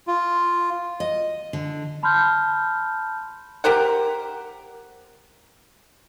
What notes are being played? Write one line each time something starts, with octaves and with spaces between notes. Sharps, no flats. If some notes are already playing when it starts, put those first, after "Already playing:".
F4
D#5
D3
A5 B5 C6 F6 G6
G4 A#4 C5 F#5